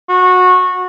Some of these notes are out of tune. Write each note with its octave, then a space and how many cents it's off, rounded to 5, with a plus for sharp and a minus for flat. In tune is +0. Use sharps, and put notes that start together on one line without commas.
F#4 -20